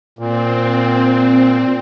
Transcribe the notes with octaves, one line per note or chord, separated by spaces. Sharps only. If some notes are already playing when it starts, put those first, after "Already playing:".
A#2 C4